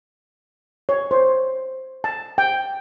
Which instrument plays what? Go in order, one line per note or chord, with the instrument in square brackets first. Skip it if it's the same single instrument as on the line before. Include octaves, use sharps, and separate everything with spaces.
[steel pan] C#5
C5
A5
G5